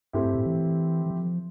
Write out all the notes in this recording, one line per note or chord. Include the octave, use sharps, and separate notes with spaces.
G2 A3 C4 E4 G4
G2
A2
E3
E3
F3